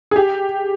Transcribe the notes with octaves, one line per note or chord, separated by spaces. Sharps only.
G#4
G4